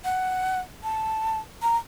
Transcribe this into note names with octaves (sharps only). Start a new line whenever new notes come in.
F#5
A5
A#5